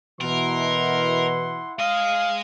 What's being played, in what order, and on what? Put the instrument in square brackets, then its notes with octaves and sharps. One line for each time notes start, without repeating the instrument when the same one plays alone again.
[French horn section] B2 E3 [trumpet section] E4 F#5 C6 [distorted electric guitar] A#4
[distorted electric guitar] G#3 D#5 [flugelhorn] F5